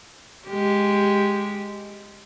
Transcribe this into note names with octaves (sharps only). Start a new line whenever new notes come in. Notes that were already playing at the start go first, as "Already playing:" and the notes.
G#3 G4